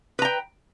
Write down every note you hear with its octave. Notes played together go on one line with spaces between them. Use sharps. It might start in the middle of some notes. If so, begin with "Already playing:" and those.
B4 G5 A#5